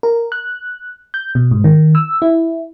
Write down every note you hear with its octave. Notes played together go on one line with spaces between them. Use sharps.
A#4
F#6
G6
B2
G#2
D#3
E6
E4